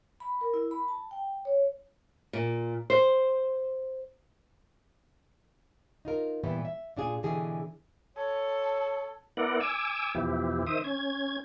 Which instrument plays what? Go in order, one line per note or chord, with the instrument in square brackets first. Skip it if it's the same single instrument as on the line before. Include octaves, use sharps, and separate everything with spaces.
[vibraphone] B5
A#4
E4
B5
A5
G5
C#5
[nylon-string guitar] A#2
C5
D#4 F4 A#4
A#2 E3 G3 B3 E4 G4
E5
A#2 D4 F4 G#4
B2 D3 E3 G4 G#4
[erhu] A4 [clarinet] C#5
[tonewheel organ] B3 E4 A#4 D5 F#5
G#5 D6 E6
E2 B2 F3 E4 G4
D#3 C5 E5 D#6
C#4 G#6